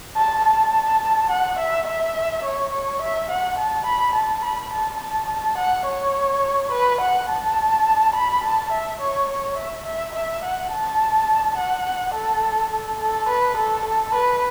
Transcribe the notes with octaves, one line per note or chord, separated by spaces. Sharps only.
A5
A5
F#5
E5
E5
C#5
C#5
E5
F#5
A5
B5
A5
B5
A5
A5
A5
F#5
C#5
B4
F#5
A5
B5
A5
E5
C#5
C#5
E5
E5
E5
F#5
A5
F#5
A4
A4
A4
B4
A4
A4
B4